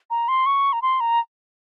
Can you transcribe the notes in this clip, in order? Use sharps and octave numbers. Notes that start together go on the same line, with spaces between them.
A#5
C6
C#6
A#5
C6
A#5